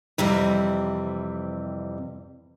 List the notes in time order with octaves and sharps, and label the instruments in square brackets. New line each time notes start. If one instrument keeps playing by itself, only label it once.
[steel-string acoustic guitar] F2 C3 E3 G3